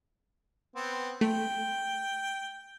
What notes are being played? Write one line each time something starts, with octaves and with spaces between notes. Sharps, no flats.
B3 C4
A3 G5